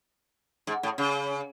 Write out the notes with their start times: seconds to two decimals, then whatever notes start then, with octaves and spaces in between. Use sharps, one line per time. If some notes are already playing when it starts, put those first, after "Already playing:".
0.67 G#2
0.83 A2
0.98 C#3